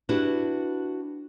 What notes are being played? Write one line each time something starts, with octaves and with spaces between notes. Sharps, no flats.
D4 E4 F#4 G4 B4